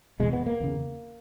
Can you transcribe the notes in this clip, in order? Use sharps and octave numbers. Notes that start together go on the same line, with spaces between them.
E2 B2 G#3
B3
A#3
E2 C#3